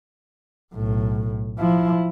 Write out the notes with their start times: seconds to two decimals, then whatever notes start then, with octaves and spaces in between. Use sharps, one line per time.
0.74 B1 A2
1.59 F3 E4